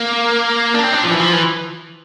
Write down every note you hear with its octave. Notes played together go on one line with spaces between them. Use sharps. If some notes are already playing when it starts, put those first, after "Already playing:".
Already playing: A#3
D4
C4
D4
F3
E3
F3
E3